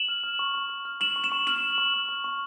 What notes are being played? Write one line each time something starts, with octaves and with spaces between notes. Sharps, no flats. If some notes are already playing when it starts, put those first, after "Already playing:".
Already playing: E7 F#7
F6
F6
C#6
C#6
C#6
F6
C#6 E7 F#7
C#6
E7 F#7
C#6
F6 E7 F#7
F6
C#6
F6
C#6
C#6